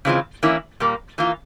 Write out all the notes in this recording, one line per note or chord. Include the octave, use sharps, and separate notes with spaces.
C#3 E3 G#3 C4 F4
E3 A#3 C#4 E4
A#2 G3 A#3
E3 A#3 F4